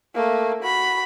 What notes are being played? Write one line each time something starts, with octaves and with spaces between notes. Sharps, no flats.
A3 A#3
F#4 B5